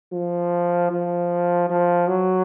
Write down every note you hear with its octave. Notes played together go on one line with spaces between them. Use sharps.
F3
F3
F3
F#3